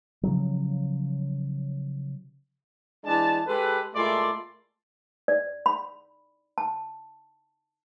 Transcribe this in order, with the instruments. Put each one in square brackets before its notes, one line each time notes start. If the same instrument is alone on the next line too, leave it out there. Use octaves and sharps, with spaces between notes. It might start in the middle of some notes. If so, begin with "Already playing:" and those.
[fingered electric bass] C#3 F3 F#3
[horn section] E3 G#3 D4 A5
G#3 G4 A4 B4
A#2 G#3 A3 E4 D5 C6
[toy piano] D5
B5
A5